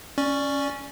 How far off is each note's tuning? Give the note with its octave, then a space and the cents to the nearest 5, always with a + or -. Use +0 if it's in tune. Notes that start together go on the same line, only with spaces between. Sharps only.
C#4 +0 D5 +0 C#6 +0